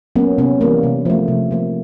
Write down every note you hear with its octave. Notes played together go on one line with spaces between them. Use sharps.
F#3 A#3 B3 C#4
C3 B3 C#4
E3 G3 A#3
C3
F3 A3
C3
F3 A#3